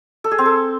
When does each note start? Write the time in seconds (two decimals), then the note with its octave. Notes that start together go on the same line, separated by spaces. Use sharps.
0.24 A4
0.31 G#4
0.38 C4
0.46 A4